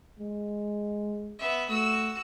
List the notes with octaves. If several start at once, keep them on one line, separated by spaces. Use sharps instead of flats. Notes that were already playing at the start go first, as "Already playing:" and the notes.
G#3
B3 E5
A3 F#4 E6